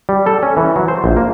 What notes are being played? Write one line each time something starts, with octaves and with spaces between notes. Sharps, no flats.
G3
A4
C#4
E3
F#3
C5
A#1
A#3